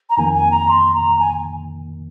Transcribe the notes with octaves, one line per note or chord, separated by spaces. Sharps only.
A#5
F2 D#3 A#3 G#5
G#5
A#5
C6
A#5
G#5